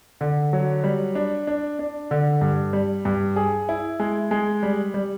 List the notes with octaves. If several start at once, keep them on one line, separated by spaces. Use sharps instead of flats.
D3
F#3
G3
D4
D4
D4
D3
G2
G3
G2
G#4
E4
G#3
G#3
G3
G3